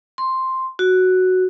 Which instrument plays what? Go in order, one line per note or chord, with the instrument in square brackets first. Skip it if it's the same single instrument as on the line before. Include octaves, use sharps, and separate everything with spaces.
[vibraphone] C6
F#4